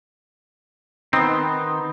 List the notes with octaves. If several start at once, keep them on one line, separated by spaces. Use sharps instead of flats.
D#3 B3 C4 D#4 C6 D#6